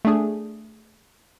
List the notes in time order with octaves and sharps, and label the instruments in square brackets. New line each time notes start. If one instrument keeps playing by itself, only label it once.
[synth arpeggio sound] A3 D4 G#4